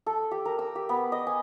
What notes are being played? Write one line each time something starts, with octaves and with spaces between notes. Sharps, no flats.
A4
G4
A#4
E6
G4
B3
D#5
G#5